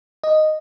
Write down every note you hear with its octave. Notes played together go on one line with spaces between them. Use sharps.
D#5